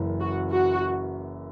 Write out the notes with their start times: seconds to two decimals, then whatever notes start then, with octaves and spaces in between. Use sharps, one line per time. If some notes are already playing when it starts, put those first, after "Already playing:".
Already playing: F#1 F#2 E3
0.20 F#4
0.50 F#4